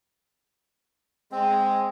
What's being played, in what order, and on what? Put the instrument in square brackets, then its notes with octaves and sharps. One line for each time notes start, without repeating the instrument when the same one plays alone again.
[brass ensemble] G#3 [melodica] C4